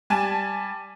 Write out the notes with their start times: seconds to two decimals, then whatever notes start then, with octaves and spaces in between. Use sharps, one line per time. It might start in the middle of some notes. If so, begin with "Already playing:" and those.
0.10 G3 G#5 A5